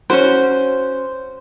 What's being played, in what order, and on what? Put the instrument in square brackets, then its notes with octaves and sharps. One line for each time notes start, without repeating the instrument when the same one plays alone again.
[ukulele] C#4 F#4 [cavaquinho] C5